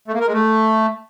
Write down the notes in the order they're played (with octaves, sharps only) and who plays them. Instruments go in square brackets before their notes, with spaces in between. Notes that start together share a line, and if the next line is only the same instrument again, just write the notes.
[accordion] A3
A#3
A#4
G#3
A3